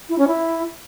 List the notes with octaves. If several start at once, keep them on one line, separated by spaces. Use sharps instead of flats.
E4
C#4
E4